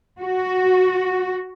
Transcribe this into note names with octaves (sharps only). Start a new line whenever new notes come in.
F#4